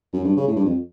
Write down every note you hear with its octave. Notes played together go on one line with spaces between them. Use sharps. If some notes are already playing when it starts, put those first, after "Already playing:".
F#2
G2
C#3
A2
G2
F2